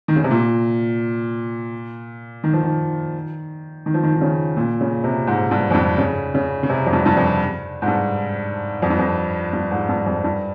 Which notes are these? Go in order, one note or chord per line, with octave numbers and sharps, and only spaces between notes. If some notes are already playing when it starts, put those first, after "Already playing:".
D#3
C#3
C3
A#2
D#3
F3
D#3
D#3
F3
D#3
D#3
C#3
A#2
C#3
C3
G#2
G2
F2
G2
C#3
C#3
C#3
C3
F2
G2
G2
F2
G#2
G2
F2
G2
F2
G2
G#2
G2
F2
G2